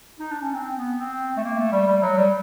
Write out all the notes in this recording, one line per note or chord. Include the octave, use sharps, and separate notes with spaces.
D#4
D4
C#4
C4
B3
C4
A3
A#3
A3
G3
G3
F#3
G3